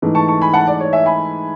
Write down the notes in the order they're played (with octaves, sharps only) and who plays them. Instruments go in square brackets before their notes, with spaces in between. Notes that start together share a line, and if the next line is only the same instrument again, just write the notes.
[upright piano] G#2 E3 A3
A5 C#6
A5 C#6
G#5 B5
F#5 A5
D5
C#5
E5 G#5
G#5 B5